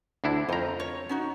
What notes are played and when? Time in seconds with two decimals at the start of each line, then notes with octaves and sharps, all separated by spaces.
0.24 D2 D4 E4
0.49 F2 F4 C5 A#5
0.80 C#5
1.09 C#4 D#4 F#4